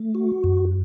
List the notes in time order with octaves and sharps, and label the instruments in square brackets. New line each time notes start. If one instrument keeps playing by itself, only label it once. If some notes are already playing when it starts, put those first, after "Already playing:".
Already playing: [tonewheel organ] A3
F#4
F#2